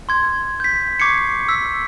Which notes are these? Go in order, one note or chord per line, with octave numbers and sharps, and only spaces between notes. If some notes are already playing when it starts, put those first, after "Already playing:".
C6 G#6
G6 B6
C#6 D6 G#6 C7 C#7
E6 B6